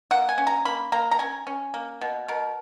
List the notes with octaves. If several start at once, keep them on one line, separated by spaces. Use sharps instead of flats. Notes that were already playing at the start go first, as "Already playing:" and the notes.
A#3 F#5
G#5
C#4
A#5
A#3 B5
A#3 A#5
A#5
C#4 G#5
C#4
A#3
B2
B2 A#4